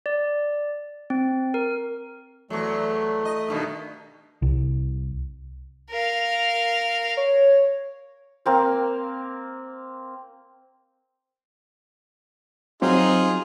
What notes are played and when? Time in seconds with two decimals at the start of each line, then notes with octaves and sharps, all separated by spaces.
0.06 D5
1.10 C4
1.54 A#4
2.50 E2 F#3 A3
3.25 D#5
3.49 G2 B2 D#3
4.42 C2
5.90 A#4 F5
7.17 C#5
8.46 A#3 C4 F5
12.82 F#3 C4 D#4 F4 G#4